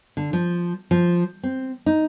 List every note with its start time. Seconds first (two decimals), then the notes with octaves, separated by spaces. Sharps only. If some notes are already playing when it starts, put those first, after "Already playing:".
0.17 D3
0.33 F3
0.91 F3
1.43 C4
1.86 D#4